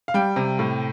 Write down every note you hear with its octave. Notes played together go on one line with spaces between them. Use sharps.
F5
G3 G5
C3
A2